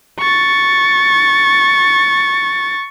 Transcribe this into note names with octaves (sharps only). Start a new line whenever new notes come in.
C#6 A6